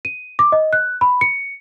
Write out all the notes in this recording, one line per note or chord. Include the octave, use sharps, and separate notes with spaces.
D#7
D6
D#5
F#6
B5
C#7